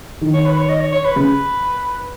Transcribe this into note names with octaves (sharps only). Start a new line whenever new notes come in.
D#3
C#5
B4
C#5
D#5
C#5
C#5
B4
C#3 B4